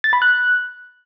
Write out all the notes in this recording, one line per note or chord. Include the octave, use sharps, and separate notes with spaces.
A6
B5
F#6